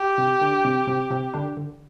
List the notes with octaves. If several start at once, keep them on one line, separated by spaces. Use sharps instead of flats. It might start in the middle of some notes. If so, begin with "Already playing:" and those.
Already playing: G4
C3 C4
D3 D4
C3 C4
C3 C4
C3 C4
D3 D4
D3